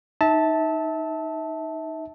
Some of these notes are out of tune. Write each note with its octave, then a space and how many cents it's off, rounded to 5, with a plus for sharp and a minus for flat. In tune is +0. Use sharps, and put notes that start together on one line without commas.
D#4 +0 E5 -30 A5 +0